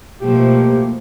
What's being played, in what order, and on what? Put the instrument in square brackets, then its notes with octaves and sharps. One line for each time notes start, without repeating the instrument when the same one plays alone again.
[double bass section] B2 [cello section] F3 A3 [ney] A#3 [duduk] G4